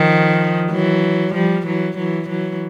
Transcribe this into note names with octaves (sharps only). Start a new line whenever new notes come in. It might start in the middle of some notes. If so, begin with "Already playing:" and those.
Already playing: D#3 F3
E3 F#3
F3 G3
E3 F#3
E3 F#3
E3 F#3